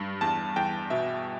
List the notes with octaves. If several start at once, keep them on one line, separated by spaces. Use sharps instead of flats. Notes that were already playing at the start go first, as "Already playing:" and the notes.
Already playing: G2
E2 A5
E2 G5
B2 E5